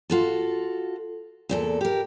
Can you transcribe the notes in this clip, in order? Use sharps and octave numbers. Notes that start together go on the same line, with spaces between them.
F4 F#4 A4
E2 A#2 A4
G4 A#4